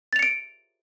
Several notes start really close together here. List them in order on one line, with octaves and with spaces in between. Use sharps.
A6 F7 C#7 D7